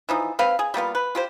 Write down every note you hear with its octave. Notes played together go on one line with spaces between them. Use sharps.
E3 F3 D#4
C4 B4 F5
G#4
G3 A#3 B3 F4
B4
F4 G4 C5